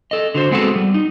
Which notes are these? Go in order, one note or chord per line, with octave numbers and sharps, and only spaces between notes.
A4 D#5
D3 F#4 C5
G#3 B3 C4 F#4 G#4 A4
G3
D#4